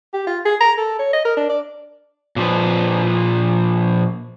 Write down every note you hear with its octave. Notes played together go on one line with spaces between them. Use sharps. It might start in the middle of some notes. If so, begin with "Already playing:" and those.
G4
F4
G#4
A#5
A4
C#5
D#5
A#4
D4
D5
A#2 F3 B4